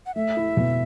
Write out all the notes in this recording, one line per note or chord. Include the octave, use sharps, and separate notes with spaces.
F#5
A3 E5
E4
B2